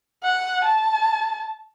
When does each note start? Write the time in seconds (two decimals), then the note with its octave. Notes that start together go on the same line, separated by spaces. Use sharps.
0.23 F#5
0.65 A5